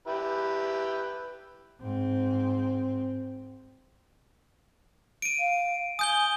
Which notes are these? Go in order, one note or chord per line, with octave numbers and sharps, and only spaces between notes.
E4 G4 B4
G#2 C4
D7 D#7
F5
G#5 D#6 G6 G7